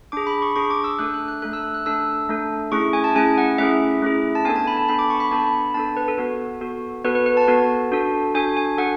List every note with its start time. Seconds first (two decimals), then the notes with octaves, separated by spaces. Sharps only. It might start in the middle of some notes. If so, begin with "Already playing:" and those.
0.12 D4 G#4 D6
0.27 B5
0.42 C#6
0.56 D4 G#4 C#6
0.70 D6
0.84 E6
0.99 A3 D4 A4 F#6
1.14 F#6
1.28 F#6
1.42 A3 D4 A4 F#6
1.53 E6
1.64 F#6
1.74 F#6
1.86 A3 D4 A4 E6
2.29 A3 D4 A4
2.72 A3 C#4 E4 G#4 C#6
2.93 G#5
3.04 A5
3.15 A3 C#4 E4 G#4 G#5
3.38 F#5
3.58 A3 C#4 E4 G#4 E5
4.02 A3 C#4 E4 G#4
4.35 A5
4.45 B3 D4 A4 G#5
4.56 A5
4.67 B5
4.77 A5
4.88 B3 D4 A4 B5
4.99 D6
5.10 C#6
5.20 B5
5.31 B3 D4 A4 A5
5.47 B5
5.74 B3 D4 A4 A5
5.97 B4
6.08 A4
6.18 B3 F#4 A4
6.61 B3 F#4 A4
7.04 B3 F#4 A4 B4
7.15 B4
7.26 B4
7.37 A5
7.48 B3 F#4 A4
7.92 D4 F#4 A4
8.35 D4 F#4 A4 G#5
8.57 G#5
8.78 D4 F#4 A4 F#5